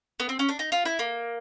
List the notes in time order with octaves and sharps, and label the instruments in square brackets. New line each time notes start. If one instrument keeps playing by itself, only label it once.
[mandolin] B3
C4
C#4
D4
D#4
F4
E4
A#3